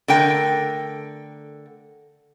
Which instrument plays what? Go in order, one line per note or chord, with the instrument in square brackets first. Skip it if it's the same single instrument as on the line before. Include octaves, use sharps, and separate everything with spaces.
[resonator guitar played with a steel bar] D3 A3 A#4 G5